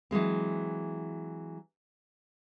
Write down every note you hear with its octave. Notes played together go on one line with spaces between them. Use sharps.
E3 F#3 G#3 C4